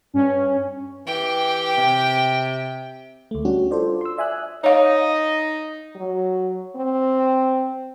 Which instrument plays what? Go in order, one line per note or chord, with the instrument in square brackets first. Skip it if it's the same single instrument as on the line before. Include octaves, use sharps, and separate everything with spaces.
[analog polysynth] G2 C#4
[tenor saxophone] E3 [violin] G4 G5
[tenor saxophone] C3
[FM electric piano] D2 A3
G3 C#4 D4 F#4 G4
F4 A4 C5 D5
C6 E6
D5 E5 G#5 D#6 F#6
[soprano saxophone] D#4 [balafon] C#5 F5 [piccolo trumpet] D#5
[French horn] F#3
C4